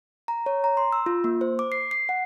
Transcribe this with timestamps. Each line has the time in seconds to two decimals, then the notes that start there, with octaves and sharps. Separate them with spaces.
0.28 A#5
0.46 C#5
0.64 A#5
0.77 C6
0.92 E6
1.06 F4
1.24 A#3
1.41 C5
1.59 D6
1.72 C7
1.91 C7
2.09 F#5